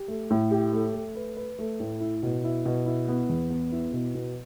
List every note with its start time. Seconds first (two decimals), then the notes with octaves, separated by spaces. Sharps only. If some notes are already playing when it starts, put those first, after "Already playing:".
Already playing: G4
0.08 A3
0.30 A2
0.51 G4
0.73 A3
0.94 A3
1.15 B4
1.37 B4
1.59 A3
1.80 A2
2.00 E4
2.23 B2
2.44 E4
2.66 B2
2.86 E4
3.08 B3
3.29 E2
3.50 B3
3.72 E4
3.93 B2
4.15 B2